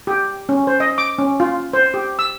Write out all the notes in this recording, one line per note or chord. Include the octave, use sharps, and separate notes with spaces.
G4
C#4
C5
D#5
D6
C#4
F4
C5
G4
E6